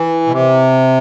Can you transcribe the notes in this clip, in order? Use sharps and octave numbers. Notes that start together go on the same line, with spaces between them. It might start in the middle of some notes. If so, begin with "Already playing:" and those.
Already playing: E3
B2
C3